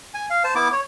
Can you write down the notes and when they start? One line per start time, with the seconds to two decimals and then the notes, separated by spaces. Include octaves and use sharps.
0.14 G#5
0.30 F5
0.44 C5 A5
0.55 B3 E4 D6
0.72 C#5